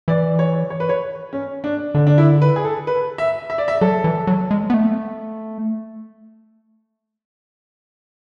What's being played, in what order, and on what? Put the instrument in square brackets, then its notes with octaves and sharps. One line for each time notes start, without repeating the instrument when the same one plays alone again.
[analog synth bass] E3 [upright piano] D5
[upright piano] C#5
C#5
B4
C#5
C#4
D4
[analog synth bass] D3 [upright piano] D4
[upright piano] D4
E4
B4
G#4
A4
B4
E5
E5
D5
E5
[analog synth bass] F#3 [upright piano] A4
[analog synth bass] E3
F#3
G#3
B3
A3